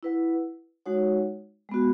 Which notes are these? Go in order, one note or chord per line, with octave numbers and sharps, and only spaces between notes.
E4 B4 F#5
G#3 D#4 F#4 C#5 F#5
G#3 B3 F#4